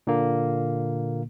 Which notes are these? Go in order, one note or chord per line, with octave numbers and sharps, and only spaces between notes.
A#2 D3 A#3